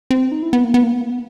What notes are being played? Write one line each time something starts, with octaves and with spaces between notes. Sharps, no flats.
C4
D#4
E4
B3
A#3
B3
A#3
B3
A#3
B3